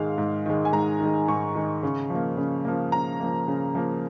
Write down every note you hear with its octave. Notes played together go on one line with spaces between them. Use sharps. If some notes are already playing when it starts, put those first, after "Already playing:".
Already playing: G#2 D#3 G#3 F5
G#2
D#3 G#3
G#5
G#2 A#5
D#3
G#3
G#2 C#6
D#3 G#3
C#3
F3
A#3
C#3
F3 A#3
C#3 A#5
F3 A#3
C#3
F3 A#3